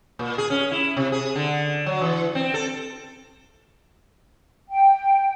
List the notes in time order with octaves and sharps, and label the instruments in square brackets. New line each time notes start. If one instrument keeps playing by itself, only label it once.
[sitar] A#2
G#4
C#4
E4
C3
G#4
D3
F#3
E3
C4
A4
[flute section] G5